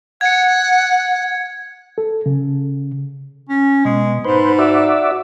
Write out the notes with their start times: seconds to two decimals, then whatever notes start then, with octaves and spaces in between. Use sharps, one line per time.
0.21 F#5 G#6 C#7
1.98 A4
2.26 C#3
3.49 C#4
3.85 B2 G#3
4.24 G#2 B4 C5
4.59 F#4 D5 E5